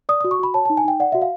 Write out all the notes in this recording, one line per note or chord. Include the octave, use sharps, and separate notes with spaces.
D5 D#6
F#4 D#6
C#6
F#4 B5
C#5 A5
D#4 A5
G#5
D#4 G5
D5 F#5
F#4 E5
F5